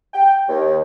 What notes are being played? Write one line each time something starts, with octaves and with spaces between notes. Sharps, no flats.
G5
D#2